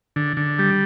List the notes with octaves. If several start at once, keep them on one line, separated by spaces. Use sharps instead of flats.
D3
D3
G3